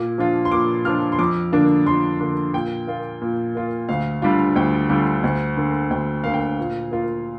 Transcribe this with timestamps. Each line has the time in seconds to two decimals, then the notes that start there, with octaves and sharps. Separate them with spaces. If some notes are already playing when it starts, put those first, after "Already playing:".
Already playing: A#2 D6
0.18 F3 D4 F4
0.45 C6
0.52 A#2 D6
0.85 F3 D4 F4 F6
1.12 C6
1.19 F2 D6
1.52 D3 A#3 D4
1.86 F2 C6
2.20 D3 A#3 D4
2.53 A#2 G5
2.87 A#3 F4
3.21 A#2
3.55 A#3 F4
3.89 D2 F5
4.22 D3 G3 D4 F4
4.56 D2 G5
4.89 D3 G3 D4 F4
5.24 D2
5.57 D3 A#3
5.90 D2 G5
6.24 D3 A#3 F5
6.34 G5
6.44 F5
6.58 A#2
6.91 A#3 F4